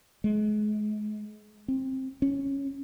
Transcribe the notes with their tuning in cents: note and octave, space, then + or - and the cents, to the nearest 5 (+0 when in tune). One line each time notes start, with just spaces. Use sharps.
G#3 +30
C4 +15
C#4 -5